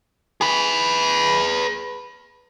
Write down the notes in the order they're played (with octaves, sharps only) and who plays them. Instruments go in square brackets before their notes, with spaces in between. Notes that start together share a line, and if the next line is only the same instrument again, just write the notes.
[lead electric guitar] G#4 B4